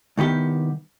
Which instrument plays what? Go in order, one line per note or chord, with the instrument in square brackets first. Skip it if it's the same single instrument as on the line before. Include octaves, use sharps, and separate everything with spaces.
[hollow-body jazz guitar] C2 D#3 B3 G4